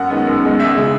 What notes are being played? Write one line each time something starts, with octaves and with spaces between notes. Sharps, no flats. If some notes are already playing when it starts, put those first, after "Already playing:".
Already playing: F#2 F#5
D#3 G#3 B3
F#2
D#3 G#3 B3
C#2 E5
C#3 G#3